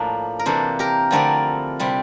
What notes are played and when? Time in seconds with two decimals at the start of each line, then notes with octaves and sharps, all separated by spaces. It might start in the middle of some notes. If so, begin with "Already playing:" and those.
Already playing: A2 F3 A#3 D4
0.39 A#4
0.46 C3 E3 A#3 D4 A4 C5
0.79 G4 A#4
1.11 D3 F3 A3 C4 E4 A#4 D5
1.79 C3 G3 C4 E4